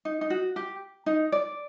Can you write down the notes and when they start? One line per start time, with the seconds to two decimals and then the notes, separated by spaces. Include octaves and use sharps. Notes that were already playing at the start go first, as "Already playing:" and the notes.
0.05 D#4
0.21 D#4
0.30 F#4
0.56 G4
1.06 D#4
1.32 D5